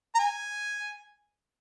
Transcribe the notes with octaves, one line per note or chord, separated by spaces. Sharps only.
A#5
G#5